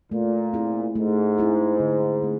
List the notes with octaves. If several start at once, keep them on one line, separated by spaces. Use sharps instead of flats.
A#2 A3
C4 E4 G#4
G#2 A3
C4 E4 G#4
D3
A3 C4